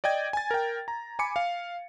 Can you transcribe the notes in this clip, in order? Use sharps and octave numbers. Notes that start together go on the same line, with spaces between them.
D5 D#5 G5 G#6
G#5 A6
A#4 G5
A#5
G#5 B5 D6 C#7
F5